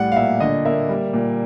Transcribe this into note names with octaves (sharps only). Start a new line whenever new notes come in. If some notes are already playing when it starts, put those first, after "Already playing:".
Already playing: A2 G3 F#5
F5
A#2 E5
D3 D#5
A#3 E5
G3
A#2